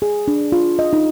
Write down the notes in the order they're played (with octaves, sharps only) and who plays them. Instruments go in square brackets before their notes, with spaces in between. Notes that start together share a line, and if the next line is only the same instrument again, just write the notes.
[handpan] G#4
D4
F4
D#5
D#4